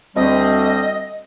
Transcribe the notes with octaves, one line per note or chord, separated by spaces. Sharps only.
D2 G3 C4 D#5